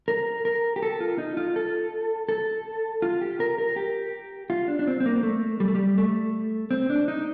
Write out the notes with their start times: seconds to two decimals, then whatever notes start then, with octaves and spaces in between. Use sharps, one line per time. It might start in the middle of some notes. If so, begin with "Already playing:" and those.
0.08 A#4
0.45 A#4
0.76 G4
0.83 A4
1.00 F4
1.18 D#4
1.37 F4
1.56 A4
2.29 A4
3.02 F4
3.21 G4
3.40 A#4
3.58 A#4
3.76 G4
4.50 F4
4.68 D4
4.79 D4
4.87 C4
5.00 C4
5.06 A#3
5.23 A3
5.60 G3
5.68 A3
5.75 G3
5.98 A3
6.71 C4
6.90 D4
7.08 D#4